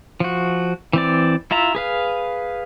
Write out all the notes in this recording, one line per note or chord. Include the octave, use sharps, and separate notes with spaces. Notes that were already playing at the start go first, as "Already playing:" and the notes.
F3 F#4
E3 C4 D5
E4 F4 E5 A#5
G#4 B4 F5